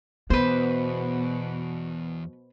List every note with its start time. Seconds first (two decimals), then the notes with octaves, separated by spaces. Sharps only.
0.30 E2 B2 B3 B4 C5